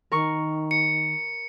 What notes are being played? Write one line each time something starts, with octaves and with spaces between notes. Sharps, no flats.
D#3 A#4 C#6
C#7